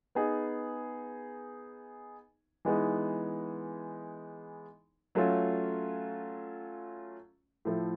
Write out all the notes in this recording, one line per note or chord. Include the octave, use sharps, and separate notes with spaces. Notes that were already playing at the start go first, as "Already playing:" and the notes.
B3 D#4 G#4
E3 G#3 B3 D#4 G#4
F#3 A3 C#4 F4
A2 F3 A3